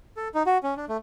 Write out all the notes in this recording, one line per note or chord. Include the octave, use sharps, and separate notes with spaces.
A4
D#4
F#4
C#4
D4
A3